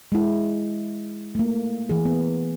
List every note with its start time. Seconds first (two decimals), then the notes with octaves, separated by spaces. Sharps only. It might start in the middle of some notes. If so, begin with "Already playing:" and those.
0.12 G#3 E4
1.35 A3 A#3
1.89 E3 G#4
2.05 B3